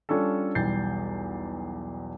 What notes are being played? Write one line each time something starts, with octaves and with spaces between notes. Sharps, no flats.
G3 C#4 D4 F4 A4
B1 E2 G3 G6 A6 C7